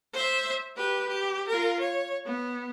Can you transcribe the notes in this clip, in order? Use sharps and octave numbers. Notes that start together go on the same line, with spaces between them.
C5 E5
G4 B4
G4
F4 A#4
C#5
B3